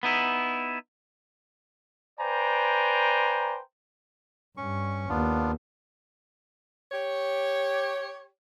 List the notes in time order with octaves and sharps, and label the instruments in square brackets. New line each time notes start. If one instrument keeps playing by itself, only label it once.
[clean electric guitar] B3 D#4 E4
[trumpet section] B4 C5 D5 G5 G#5 A#5
[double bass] G2 [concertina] C#4 C#6
[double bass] D#2 [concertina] B3 D4 F4
[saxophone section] G4 C#5